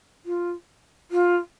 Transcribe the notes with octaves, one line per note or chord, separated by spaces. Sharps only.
F4
F4